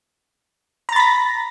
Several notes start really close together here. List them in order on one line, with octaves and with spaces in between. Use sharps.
A#5 A6 B5 A#6